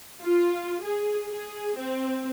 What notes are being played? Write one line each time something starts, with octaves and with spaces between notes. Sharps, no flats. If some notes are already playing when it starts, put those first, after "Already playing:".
F4
G#4
G#4
C4